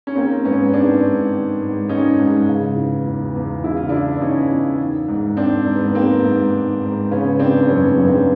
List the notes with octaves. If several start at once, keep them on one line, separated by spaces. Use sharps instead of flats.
C#4
D#3 A#3 C4
G#2 B3 C#4
D#3 C4 D4
G#2
D#3
G#2
D#3 C#4 D#4
G#2
C#3
E3
E2
E2
C#3 E4
F4
E3 D4 E4
E2 C#4 D#4
E2
D#3
G#2
D#3 C4 D4
G#2
B3
D#3 A#3 C4
G#2
D#3
G#2
C#3 B3 C#4
E3 C4 D4
C4
F#2 B3 C#4
B3 C#4
F#2
C4 D4